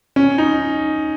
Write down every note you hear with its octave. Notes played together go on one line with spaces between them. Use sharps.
C#4
D#4